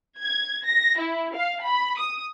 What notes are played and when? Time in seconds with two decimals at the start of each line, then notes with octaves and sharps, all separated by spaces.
0.21 G#6
0.67 A#6
0.99 E4
1.34 F5
1.64 B5
1.98 D#6